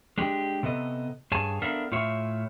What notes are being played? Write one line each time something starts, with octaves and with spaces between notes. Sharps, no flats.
G#3 D4 G4
C3 B3 A4 D#5
G2 G#4 C#5 G#5 A5
B3 D4 A4 A#4 E5 F5
A2 F4 C#5 E5